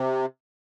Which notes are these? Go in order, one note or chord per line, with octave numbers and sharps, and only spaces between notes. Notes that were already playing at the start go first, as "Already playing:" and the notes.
Already playing: C3